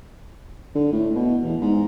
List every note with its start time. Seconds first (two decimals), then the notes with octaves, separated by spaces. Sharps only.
0.75 D3
0.92 A2
1.15 B2
1.42 E2
1.61 G#2